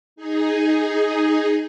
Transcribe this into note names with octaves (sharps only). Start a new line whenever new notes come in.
D#4 G#4